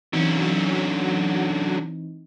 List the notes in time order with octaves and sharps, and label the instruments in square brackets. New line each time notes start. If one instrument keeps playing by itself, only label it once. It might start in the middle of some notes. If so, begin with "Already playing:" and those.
[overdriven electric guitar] D3 C#4 [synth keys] E3 C4 D#4 [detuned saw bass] F#3